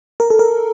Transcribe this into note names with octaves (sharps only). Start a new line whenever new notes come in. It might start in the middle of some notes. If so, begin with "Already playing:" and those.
A#4
A4
A#4